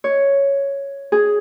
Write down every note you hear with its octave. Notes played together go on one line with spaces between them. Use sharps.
C#5
G#4